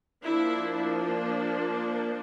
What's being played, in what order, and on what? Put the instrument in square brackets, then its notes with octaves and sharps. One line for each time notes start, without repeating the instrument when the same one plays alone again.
[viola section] F3 A#3 D4 E4